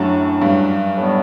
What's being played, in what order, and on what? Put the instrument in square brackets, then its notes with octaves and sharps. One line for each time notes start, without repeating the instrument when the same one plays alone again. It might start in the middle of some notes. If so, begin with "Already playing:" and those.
Already playing: [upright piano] F#2 [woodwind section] A2 F#3 A3 D4 F#4
[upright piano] G2
[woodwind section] A2 G3 B3